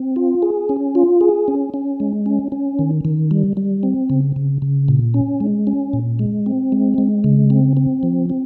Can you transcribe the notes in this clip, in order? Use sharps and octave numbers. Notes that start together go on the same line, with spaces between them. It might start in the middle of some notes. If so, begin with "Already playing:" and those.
Already playing: C4
F4
G#4
C#4
F4
G#4
C#4
C#4
G#3
C#4
C#4
D#3
D#3
G3
G3
C4
C#3
C#3
C#3
A#2
C#4
G#3
C#4
A#2
G#3
C4
G#3
G#3
C#3
C4
C4
F3
C4